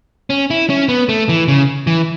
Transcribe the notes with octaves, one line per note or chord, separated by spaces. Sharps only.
C#4
E4
C#4
B3
A3
E3
C#3
E3